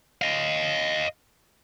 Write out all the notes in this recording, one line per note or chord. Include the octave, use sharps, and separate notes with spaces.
D#5 F5